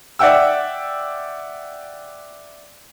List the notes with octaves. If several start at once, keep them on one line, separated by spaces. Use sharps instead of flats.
D5 E5 F#5 G5 E6